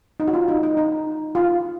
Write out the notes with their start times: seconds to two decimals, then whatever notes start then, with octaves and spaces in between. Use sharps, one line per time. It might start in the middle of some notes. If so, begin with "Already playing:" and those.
0.20 D#4
0.28 F#4
0.34 F4
0.48 D#4
0.63 D#4
0.77 D#4
1.35 F4